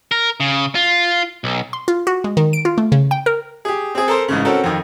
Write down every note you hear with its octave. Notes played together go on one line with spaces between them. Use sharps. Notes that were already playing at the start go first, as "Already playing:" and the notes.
A#4
C#3
F4
B1
C6
F4
F#4
G#3
D#3
D7
F4
A3
C#3
G5
A#4
G4 G#4
C4 G#4
A4 A#4 C5
A1 G#2 C#3
C4 C#4 F#4 A4 A#4
F2 D#3